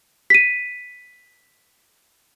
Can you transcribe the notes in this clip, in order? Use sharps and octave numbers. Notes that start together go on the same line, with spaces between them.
B6 D#7